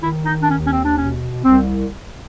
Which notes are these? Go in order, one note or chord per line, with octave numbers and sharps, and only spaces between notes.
D#3 E4
D#4
D4
D#2 C#4
C#4
C4
D4
B2 C#4
C2 C4